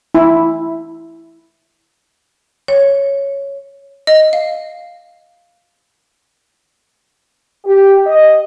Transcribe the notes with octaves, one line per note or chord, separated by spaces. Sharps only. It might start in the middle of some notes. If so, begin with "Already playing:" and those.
E4
C#5
D#5
F5
G4
D#5